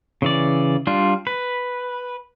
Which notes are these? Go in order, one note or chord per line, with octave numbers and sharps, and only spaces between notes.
C#3 E3 D5
G3 D4 F4
B4